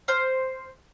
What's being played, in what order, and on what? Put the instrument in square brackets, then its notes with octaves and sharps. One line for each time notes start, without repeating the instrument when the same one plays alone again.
[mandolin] C5 F6